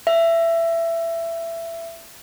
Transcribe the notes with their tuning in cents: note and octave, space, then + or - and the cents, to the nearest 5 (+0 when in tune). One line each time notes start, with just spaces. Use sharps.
E5 +20